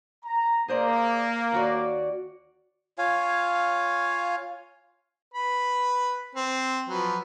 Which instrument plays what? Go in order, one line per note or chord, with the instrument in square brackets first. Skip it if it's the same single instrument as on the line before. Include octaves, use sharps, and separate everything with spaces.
[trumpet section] A#5
[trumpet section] A#3 [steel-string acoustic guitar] G#4 C5 D5
[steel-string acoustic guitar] D#2 F#4 D5
[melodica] F4 C#5 F5 G#5
[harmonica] B4 B5
C4
F3 F#3 B4